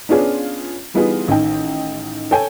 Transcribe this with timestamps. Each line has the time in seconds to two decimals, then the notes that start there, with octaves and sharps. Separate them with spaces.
0.09 B3 C#4 D4 F4 G#4
0.94 E3 G3 B3 D#4 F4 G#4
1.28 A1 D#3 D#4 G5
2.31 A4 C#5 G5 G#5